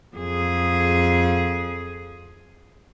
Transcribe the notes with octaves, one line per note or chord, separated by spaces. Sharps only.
F2 G#4